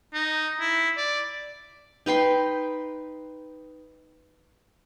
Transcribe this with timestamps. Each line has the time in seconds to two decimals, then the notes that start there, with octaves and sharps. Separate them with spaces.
0.14 D#4
0.60 E4
0.97 D5
2.06 D#4 B4 G5 C6